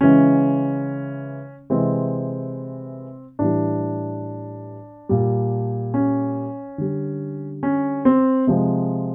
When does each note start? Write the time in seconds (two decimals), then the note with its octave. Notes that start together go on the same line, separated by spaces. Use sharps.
0.01 C#3 E3 G#3 C#4
1.70 C3 E3 G#3 C4
3.39 A2 E3 G3 D4
5.09 A#2 G3
5.94 C#4
6.78 D3 G3
7.63 C#4
8.05 C4
8.47 C3 F3 G#3